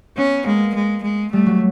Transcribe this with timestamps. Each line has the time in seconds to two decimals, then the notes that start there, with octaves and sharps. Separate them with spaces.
0.17 B3 C#4
0.45 G#3 A#3
0.75 G#3
1.03 G#3
1.32 G3 A3
1.46 F#3